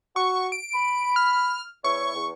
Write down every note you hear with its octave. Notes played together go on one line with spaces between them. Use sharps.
F#4 C#6
D7
B5
F6
E2 E4 C#5 C#6
E2